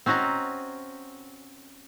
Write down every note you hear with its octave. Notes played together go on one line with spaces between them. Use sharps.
C4 C#4 F#4 D#5 A#5